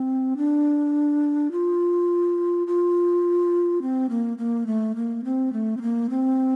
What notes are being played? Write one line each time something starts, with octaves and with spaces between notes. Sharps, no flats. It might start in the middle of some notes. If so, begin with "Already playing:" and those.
Already playing: C4
D4
F4
F4
C4
A#3
A#3
A3
A#3
C4
A3
C4
A#3
C4